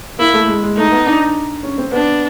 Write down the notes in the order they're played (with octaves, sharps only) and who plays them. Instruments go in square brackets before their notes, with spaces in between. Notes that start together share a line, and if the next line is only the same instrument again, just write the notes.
[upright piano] A#3 [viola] E4
[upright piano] A3
G#3
G#3
[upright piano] A3 [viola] D#4
[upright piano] B3
D4
C#4
C4
[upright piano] B3 [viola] D4